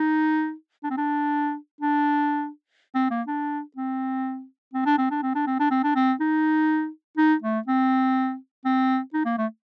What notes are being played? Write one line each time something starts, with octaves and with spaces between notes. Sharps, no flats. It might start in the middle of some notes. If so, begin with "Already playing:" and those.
Already playing: D#4
D4
C4
D4
D4
C4
A#3
D4
C4
C4
D4
C4
D4
C4
D4
C4
D4
C4
D4
C4
D#4
D#4
A3
C4
C4
D#4
A#3
A3